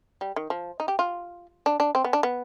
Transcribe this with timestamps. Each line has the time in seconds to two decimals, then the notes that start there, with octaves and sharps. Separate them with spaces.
0.21 G3
0.36 D#3
0.50 F3
0.80 D#4
0.88 G4
0.99 F4
1.66 D4
1.80 D4
1.95 C4
2.04 B3
2.13 D4
2.23 B3